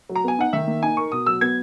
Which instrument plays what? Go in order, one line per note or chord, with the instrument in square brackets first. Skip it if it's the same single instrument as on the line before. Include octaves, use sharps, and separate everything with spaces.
[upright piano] F#3
[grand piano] A#5
[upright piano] B3 [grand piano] G#5
[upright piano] D#4 [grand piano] F#5
[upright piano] D#3 [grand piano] E5
[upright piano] A#3
[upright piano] D#4 [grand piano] G#5
[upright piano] A#4 [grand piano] C#6
[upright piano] B2 [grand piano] D#6
[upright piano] F#3 [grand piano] E6
[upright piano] B3 [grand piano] G#6